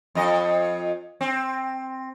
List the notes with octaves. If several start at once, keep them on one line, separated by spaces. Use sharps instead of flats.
F2 D#5
C4